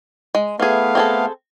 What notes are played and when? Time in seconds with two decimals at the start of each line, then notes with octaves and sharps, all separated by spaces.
0.35 G#3
0.60 E3 A3 B3 G#4 F5
0.95 C4 G#4 A4